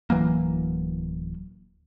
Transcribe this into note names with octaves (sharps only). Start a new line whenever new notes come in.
D1 E3 F#3 A#3